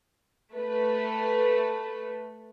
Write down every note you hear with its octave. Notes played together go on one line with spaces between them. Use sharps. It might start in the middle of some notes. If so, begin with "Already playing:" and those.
A3 B4